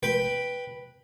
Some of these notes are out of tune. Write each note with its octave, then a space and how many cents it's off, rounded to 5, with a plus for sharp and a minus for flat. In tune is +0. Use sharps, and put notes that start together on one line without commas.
B4 -5 G5 +0